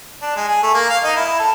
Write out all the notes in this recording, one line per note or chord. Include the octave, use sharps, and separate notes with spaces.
D4
G#3
G#4
A3
A#3
F5
D#4
E4
A4